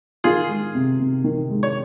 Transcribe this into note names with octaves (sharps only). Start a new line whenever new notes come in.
D#3 F4 G#4
G#3
C3
C3
D#3
G#3
C#5